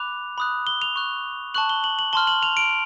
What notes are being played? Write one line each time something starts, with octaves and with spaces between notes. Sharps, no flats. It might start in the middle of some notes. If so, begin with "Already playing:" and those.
Already playing: B5 D6 F#6 F7
B5 D#6 F#6
G7
F7
C#6 F#6
A5 C#6 F#6 F#7
G7
F#7
F#7
A5 C6 F6 G7
F#7
F7
D7